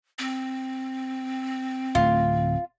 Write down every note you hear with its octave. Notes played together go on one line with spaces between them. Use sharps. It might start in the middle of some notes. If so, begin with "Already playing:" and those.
C4
D1 A3 F4